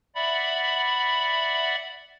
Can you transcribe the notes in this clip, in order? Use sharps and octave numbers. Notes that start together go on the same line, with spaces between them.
D5 E5 F#5 B5